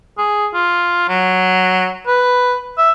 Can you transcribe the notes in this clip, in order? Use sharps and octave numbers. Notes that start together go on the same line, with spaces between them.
G#4
F4
F#3
B4
E5